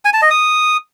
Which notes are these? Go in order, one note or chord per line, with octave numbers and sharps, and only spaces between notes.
G#5
A5
D#5
D#6